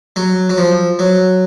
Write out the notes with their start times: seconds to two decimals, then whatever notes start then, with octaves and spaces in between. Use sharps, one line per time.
0.16 F#3
0.50 F#3
0.58 F3
0.99 F#3